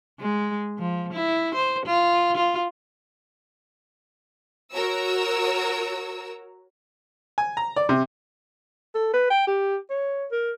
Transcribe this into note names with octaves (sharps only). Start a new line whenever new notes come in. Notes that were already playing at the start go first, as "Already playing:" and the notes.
G#3
F3
E4
C5
F4
F4
F#4 A#4 C#5 A#5 E6
G#5
A#5
D5
C3
A4
B4
G5
G4
C#5
A#4